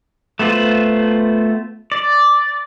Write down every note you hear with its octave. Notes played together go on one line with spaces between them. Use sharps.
A3 B3 F4 B4 C5
D5